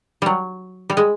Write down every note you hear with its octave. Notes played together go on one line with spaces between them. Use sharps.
F#3 G3
G3
G#3